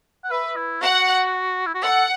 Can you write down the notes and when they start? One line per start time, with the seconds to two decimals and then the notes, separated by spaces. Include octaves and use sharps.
0.24 F#5
0.31 B4 E5
0.56 E4
0.81 F#4 F#5
1.67 E4
1.75 F#4
1.83 A4 F#5